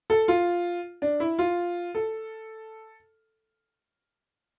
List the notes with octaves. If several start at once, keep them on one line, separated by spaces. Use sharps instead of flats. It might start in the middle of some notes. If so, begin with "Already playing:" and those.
A4
F4
D4
E4
F4
A4